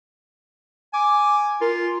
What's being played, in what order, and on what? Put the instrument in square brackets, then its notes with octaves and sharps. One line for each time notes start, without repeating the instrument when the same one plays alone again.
[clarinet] G#5 [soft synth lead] D6
[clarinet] F4 [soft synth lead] A#4